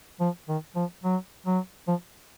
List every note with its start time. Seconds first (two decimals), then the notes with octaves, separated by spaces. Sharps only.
0.20 F3
0.48 D#3
0.76 F3
1.04 F#3
1.46 F#3
1.88 F3